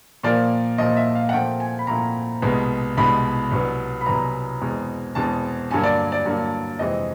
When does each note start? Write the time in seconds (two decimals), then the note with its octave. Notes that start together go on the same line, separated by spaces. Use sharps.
0.23 A#2 F3 A#3 D5
0.78 A#2 F3 A#3 D#5
0.97 E5
1.15 F5
1.29 F#5
1.32 A#2 F3 A3 C4 G5
1.60 G#5
1.79 B5
1.87 A#2 F3 A3 C4 A#5
2.42 C2 B2 G#3 B3
2.97 C2 B2 G#3 B3 B5
3.51 C2 B2 F#3 B3
4.01 B5
4.06 C2 B2 F#3 B3 A#5
4.61 E2 B2 G#3 C4
5.15 E2 B2 G#3 C4 A5
5.71 G2 D3 F#3 A#3 G#5
5.83 D5
6.12 D5
6.25 G2 D3 F#3 A#3
6.79 F2 C3 E3 G#3 C4 D#5